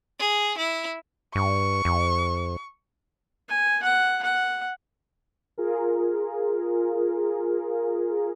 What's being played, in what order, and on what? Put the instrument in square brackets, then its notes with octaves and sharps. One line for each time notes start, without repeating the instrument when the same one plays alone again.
[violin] G#4
E4
[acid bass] G2 [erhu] C#6
[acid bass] F2
[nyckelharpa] G#5
F#5
F#5
[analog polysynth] F4 G#4 A#4